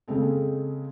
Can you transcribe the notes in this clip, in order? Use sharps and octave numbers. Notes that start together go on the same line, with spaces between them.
C#3 G#3 C4 A4